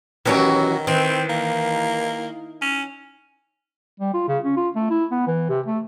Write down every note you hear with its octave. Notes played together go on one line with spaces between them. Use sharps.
B2 D#3 E3 F#3 C#4 F#4 G4
D#3 E3 C4
A#3
C#4
G3
F4
C#3
C#4
F4
A3
E4
B3
E3
C3
A3